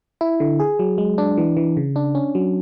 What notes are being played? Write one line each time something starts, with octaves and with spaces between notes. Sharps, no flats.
E4
D3
G#4
F#3
G#3
D4
E3
E3
C#3
D4
C#4
F#3